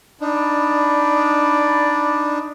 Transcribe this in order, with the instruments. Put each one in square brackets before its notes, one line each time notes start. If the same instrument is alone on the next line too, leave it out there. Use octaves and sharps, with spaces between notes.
[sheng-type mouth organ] D4 D#4 [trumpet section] D5 B5